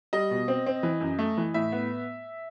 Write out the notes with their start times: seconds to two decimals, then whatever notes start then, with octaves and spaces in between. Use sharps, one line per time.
0.13 G3 D#5
0.31 B2
0.48 C4
0.66 C4
0.83 E3
1.01 F#2
1.19 A3
1.38 E3
1.54 A2 E5
1.72 B3